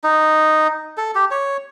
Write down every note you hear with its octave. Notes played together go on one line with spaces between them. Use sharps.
D#4
A4
G4
C#5